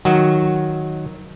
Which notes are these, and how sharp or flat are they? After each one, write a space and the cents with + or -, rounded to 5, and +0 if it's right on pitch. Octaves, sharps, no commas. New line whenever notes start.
D#3 +0 F#3 +0 F#4 +0